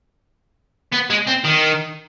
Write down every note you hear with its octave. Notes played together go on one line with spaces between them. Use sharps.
B3
G#3
C4
D#3